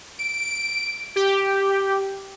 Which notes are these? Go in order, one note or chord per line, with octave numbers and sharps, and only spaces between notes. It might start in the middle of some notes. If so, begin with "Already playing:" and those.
D7
G4